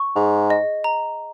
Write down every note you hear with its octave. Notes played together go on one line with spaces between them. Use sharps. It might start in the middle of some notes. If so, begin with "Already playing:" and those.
Already playing: C#6
G#2 G#4
D#5
A#5